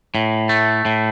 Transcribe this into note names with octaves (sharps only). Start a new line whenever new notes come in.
A2
A3
A2